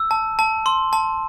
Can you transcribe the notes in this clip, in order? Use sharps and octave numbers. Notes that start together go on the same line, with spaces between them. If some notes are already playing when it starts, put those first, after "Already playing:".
Already playing: E6
A5
A5
C6
A5